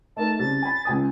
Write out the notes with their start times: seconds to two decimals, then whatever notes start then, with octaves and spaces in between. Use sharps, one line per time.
0.17 A3 D#4 A#4 A5
0.39 C2 C#3 A6
0.62 G#5 B5
0.85 C#2 G#5 D#6